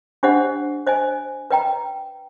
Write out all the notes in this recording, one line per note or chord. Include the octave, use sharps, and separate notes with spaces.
D4 G4 C5 D#5 F#5
C5 D#5 G#5
B4 D#5 G5 A#5